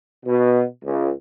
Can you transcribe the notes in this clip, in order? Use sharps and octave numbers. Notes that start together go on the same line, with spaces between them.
B2
C#2